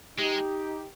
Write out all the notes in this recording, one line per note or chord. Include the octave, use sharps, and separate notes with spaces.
G#3 D#4 G4